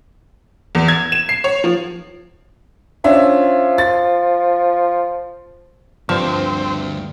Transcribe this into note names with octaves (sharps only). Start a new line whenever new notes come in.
E2
G#6
E7
C7
C#5
F3
F3 C#4 D4 E5
A6
D2 G2 D3 F3 C4